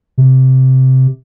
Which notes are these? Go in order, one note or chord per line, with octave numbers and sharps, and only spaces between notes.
C3